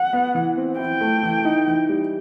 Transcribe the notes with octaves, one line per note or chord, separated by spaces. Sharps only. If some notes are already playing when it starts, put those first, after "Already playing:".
Already playing: F#5
B3
E3
C4
E4 G5
A3
E3
D#4
E3
G3